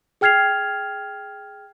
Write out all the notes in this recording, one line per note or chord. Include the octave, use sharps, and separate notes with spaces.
G#4 G5 F6 G#6 C7 F7